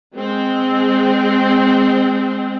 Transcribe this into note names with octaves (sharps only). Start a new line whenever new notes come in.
G#3 C4